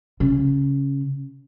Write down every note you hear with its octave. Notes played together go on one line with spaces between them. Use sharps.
C#3